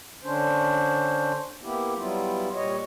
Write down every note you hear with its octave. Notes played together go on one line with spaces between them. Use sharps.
D3 C#4 D4 C5
A#3 B3 E4 G4
F#3 G3 B3 E4 F4
A#2 G3 C#5 D#5